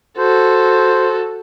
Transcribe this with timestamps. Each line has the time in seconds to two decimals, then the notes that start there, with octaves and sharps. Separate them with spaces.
0.18 F#4 A4 C5